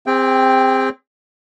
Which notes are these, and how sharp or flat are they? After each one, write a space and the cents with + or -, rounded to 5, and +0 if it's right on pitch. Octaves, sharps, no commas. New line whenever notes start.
C4 +0 G#4 -40 G5 +0